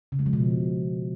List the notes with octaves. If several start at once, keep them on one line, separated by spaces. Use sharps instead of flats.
C#3
G#3
F3
B2
C#3